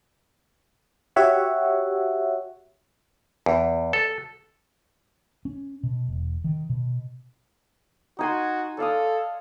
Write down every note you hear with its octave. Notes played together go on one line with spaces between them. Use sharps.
F#4 G4 C#5 E5 F#5
E2
A4
C#4
B2
E1
D#3
B2
D#4 F#4 G#5 C6
A4 D5 F5 D#6